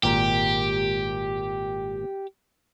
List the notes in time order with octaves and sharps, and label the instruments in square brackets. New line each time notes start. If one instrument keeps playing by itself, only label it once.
[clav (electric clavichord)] G#1 A#2 A#4 [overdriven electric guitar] G4